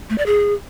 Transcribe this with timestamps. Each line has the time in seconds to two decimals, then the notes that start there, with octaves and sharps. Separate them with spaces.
0.10 A3
0.18 D5
0.26 G#4